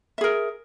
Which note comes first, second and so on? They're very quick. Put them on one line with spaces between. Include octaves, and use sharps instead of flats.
E5 G#4 A#4